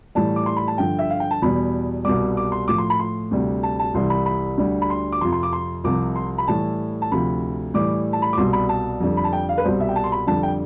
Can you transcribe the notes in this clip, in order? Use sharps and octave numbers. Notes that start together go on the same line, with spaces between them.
A2 E3 G3 A5
D6
C6
B5
A5
G2 D3 F3 G5
E5
F5
G5
A5
E2 B2 G3 B5
C2 B2 G3 D6
D6
C6
A2 F3 D6
C6
B5
C6
D2 C3 G3
A5
A5
C2 C3 E3 G3 C6
B5
B5
D2 D3 G3
B5
C6
D6
F2 C3 F3 C6
C6
D6
C6
C2 C3 F3 D6
C6
B5
A2 E3 G3 A5
A5
D2 C3 F3 B5
A2 E3 G3 D6
A5
B5
D6
C2 B2 G3 C6
B5
A5
F2 D3 G3
B5
A5
G5
F5
B4
C2 B2 G3 C5
E5
G5
A5
C6
B5
F2 D3 G3 A5
G5